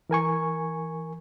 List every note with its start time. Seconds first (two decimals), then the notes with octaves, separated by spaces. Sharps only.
0.10 E3 A#4 G#5 C#6